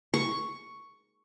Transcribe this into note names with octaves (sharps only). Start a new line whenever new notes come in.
C#6